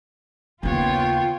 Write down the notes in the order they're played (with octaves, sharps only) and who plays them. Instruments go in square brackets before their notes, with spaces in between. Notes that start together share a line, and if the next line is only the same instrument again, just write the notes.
[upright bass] D#2 C#3 [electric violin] B3 C#5 [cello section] F4 [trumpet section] G5